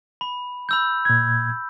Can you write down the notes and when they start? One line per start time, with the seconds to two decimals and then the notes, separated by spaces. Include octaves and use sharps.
0.21 B5
0.69 B5 E6 G6
1.05 A#2 G#6